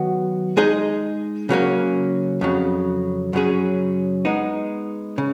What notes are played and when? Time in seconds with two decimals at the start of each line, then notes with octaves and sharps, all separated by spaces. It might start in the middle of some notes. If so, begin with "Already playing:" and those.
Already playing: D#3 F#3 B3 F#4
0.57 G#3 D#4 G#4 D#5
1.49 C#3 F#3 A#3 C#4
2.41 F2 C#3 F#3
3.33 F#2 C#3 F#3 C#4 G#4
4.25 G#3 B3 D#4
5.18 C#3